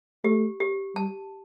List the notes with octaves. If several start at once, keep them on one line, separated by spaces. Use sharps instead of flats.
A3 G4
G4
G3 A5